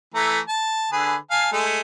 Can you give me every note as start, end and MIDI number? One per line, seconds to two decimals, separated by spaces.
0.14 0.39 52
0.14 0.39 57
0.14 0.39 82
0.48 0.88 81
0.92 1.15 50
0.92 1.15 68
0.92 1.15 71
1.31 1.50 77
1.31 1.50 80
1.31 1.50 81
1.52 1.81 56
1.52 1.81 57